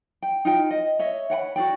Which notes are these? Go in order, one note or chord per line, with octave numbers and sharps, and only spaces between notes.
G5
D#4 F4 G5
D#5
C#5 D#5 E5
C#5 F#5 G5 B5
F#4 G#4 D5 G5